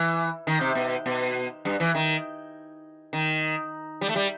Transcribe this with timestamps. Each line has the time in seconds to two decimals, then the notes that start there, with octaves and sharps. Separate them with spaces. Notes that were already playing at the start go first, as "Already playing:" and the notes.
Already playing: E3
0.47 D#3
0.61 C3
0.75 B2
1.06 B2
1.65 G2
1.80 E3
1.95 D#3
3.13 D#3
4.01 G3
4.09 A3
4.16 G3